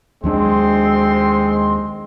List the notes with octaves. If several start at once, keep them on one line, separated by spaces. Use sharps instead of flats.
D#2 F#3 G#3 C4 D4 C6